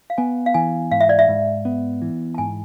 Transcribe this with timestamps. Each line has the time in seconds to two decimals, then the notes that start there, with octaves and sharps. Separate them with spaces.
0.10 F5
0.18 B3 G#5
0.46 F5
0.54 E3 G#5
0.91 G#2 F5
1.01 E5
1.09 D5
1.19 E5
1.29 G#2
1.65 B3
2.02 E3
2.35 A5
2.38 G#2 G#5